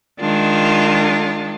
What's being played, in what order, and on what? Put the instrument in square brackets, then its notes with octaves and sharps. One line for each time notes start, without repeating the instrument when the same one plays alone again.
[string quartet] D#3 G#3 D4 F4